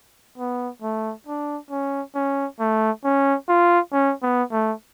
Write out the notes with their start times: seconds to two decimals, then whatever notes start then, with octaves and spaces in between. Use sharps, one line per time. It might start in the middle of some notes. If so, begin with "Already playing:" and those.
0.38 B3
0.82 A3
1.27 D4
1.71 C#4
2.15 C#4
2.60 A3
3.04 C#4
3.48 F4
3.92 C#4
4.23 B3
4.52 A3